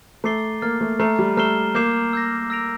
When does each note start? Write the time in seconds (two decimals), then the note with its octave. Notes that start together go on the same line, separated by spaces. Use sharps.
0.24 A3 A#5 D6 A6 C7 G7
0.61 A#3 F6 A6 C7
0.81 A3
1.00 A3 A#5 F6 C7
1.19 G3
1.37 A3 A#5 F6 C7 E7 G7
1.75 A#3 D6 G6 C7 E7
2.13 E6 G6 A#6
2.50 E6 A#6 D7 F7